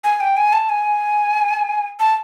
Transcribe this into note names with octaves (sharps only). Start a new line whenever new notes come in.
G#5
G5
G#5
A5
G#5
A5